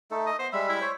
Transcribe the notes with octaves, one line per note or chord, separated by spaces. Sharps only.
A3 D#4 A4
D#5
B3 C5
G3 G#3 E5 B5
E4
C5 C#5